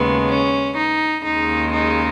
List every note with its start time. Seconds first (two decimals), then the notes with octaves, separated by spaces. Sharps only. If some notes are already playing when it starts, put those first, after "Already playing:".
Already playing: D#2 C#3 G#3 B3
0.29 C#4
0.77 D#4
1.25 D#2 C#3 G#3 D#4
1.73 D#4